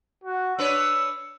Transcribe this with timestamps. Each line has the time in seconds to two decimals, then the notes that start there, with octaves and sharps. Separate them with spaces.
0.24 F#4
0.58 D4 B4 C#5 E6